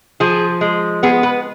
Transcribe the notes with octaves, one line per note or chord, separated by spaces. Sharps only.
F3 G#4
G#3
B3 G#4
B4